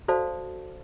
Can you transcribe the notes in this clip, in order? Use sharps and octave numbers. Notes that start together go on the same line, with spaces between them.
F#4 A4 C5 D5 F5 A5